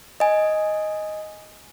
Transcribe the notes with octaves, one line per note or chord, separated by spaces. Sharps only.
D#5 G#5